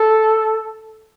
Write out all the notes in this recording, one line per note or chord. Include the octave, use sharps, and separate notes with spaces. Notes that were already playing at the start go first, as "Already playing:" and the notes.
Already playing: A4